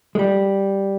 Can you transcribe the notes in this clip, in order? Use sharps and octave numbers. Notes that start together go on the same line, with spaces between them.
G#3
G3